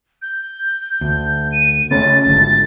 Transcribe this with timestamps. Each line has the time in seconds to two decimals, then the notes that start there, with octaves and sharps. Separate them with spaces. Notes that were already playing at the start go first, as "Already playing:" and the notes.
0.22 G6
1.01 D2
1.52 D#7
1.91 C#3 A3 C#4 A6
2.26 G#1 D3